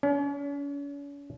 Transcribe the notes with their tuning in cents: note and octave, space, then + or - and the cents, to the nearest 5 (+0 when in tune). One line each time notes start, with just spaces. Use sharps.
C#4 +40